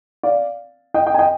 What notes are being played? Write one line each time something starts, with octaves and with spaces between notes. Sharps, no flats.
D5 F5
D#5 G5
D#5 G5
G#5
D#5 G5